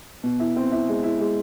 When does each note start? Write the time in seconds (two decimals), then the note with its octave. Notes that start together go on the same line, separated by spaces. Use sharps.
0.23 B2
0.40 E4
0.56 C4
0.72 E4
0.88 G#3
1.03 E4
1.20 G#3